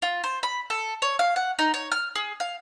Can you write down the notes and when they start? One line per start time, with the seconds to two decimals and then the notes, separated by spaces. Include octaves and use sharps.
0.02 F4
0.24 C5
0.43 B5
0.70 A4
1.02 C#5
1.19 F5
1.36 F#5
1.59 D#4
1.74 C#5
1.92 F6
2.16 G#4
2.40 F5